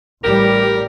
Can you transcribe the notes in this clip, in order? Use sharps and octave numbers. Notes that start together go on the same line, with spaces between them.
A1 G3 G4 A#4